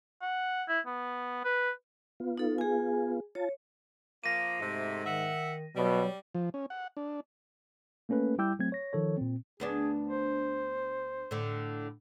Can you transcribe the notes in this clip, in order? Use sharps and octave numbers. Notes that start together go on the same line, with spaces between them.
F#5
E4
B3
B4
B3 F4
D#4 A4
G#4 G#5
F4 C#5 A5
F3 A#3 A#6 D#7
G#2 C3 A3
D#3 E5 F#5
B2 F#3 G3
F3
C#4
F#5
D4
A3 A#3 C#4 A4 B4
G3 E4 G5 D6 E6 G6
F#3 A3 C4 G#6
C#5 A#6
D#3 F3 A4 C#5
A#2 C4
D2 B3 D4 G#4
C5
A2 D3